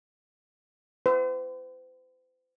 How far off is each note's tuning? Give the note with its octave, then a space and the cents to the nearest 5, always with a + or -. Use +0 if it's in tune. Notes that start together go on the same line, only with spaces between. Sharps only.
C5 -40